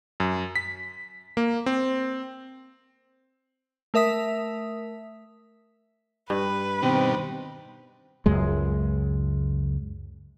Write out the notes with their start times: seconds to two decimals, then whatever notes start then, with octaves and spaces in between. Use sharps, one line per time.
0.20 F#2
0.56 B6
1.37 A#3
1.66 C4
3.94 A3 A#4 E5 D#6 B6
6.30 G2 B4
6.83 B2 D#3 G3 C4
8.26 C#2 F#2 G#3